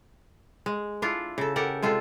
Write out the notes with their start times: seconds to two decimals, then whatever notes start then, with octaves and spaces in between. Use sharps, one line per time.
0.66 G#3
1.02 D4 E4 F4
1.38 C#3 A4
1.56 G4 A4 A#4 F#5
1.82 C3 G#3 F4 A4